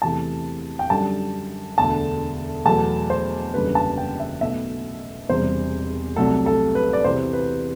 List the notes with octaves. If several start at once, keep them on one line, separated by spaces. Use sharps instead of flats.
E2 C3 E3 A3 A5
G5
F#2 D3 G3 A5
E1 D2 D3 A5
E2 B2 F#3 A3 A5
C5
F#1 E2 D3 G3 B4
A5
G5
E5
B1 B2 A3 E5
E1 E2 C3 G3 C5
C2 C3 F#3 A3 A4
A4
B4
D5
E2 C3 E3 B3 C5
B4